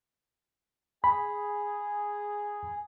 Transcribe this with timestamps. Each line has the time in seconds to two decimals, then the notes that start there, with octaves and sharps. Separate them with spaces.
1.04 G#4 B5